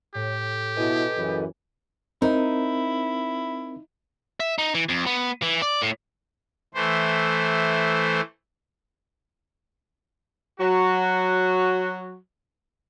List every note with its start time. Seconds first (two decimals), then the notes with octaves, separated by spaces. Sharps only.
0.15 A2 G4
0.77 B2 E4 A4 B4 D#5 G#5
1.16 F#2 C#3 E3
2.22 C4 D#4 E4 A#4
4.40 E5
4.58 D#4
4.75 E3
4.89 F2
5.06 B3
5.42 E3
5.62 D5
5.82 A2
6.74 E3 A3 C5
10.60 F#3 F#4